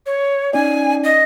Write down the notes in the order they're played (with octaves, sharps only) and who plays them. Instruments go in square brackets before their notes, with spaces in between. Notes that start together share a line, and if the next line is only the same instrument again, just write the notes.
[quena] C#5
[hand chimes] C#4 D#4 D5 [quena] G#5
[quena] D#5